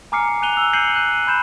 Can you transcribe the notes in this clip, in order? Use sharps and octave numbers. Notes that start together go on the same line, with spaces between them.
G#5 A#5 D6 F6 C7 C#7
G#5 F#6 D#7 F7 G7
E6
G6 C7 C#7 D#7 F#7
F#6 D#7
B5 G6 E7